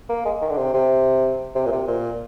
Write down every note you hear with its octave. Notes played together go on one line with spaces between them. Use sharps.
A#3
G#3
D#3
D3
C3
C3
C3
A#2
C3
A#2